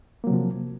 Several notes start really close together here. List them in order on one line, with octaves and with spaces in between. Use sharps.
A#3 F#3 C3 F3